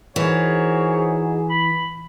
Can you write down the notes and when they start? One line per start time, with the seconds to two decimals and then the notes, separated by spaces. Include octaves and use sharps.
0.16 E3 D#4 F#4 G#4 A#4 C5 C#5
1.50 B5